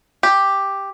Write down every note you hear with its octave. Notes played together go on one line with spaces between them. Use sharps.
G4